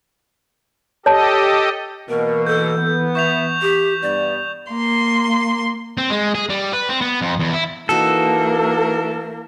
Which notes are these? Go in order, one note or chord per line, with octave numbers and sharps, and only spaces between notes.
G4 A4 C#5 D#5 A5
B2 E3 A#3 A#4
A4 G6
B3
E5 C#6 G6 F7
G4
G2 B3 D5
A#3 C6
C4
G#3
G#4
G3
B4
C4
B3
F2
E2
E4
E3 A#3 D4 D#4 F#4 A4 A#4